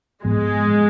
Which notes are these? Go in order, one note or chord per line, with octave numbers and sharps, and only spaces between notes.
G#2 F3 G#3 B3